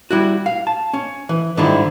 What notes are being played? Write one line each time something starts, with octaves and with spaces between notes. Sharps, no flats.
G3 E4 F#4
F5
A5
C#4
E3
G#2 D3 D#3 G3 E4 F4